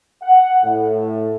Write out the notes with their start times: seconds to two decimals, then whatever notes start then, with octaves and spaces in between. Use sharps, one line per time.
0.23 F#5
0.64 A2